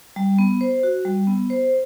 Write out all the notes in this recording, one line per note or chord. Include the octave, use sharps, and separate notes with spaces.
G3
B3
C5
F#4
G3
B3
C5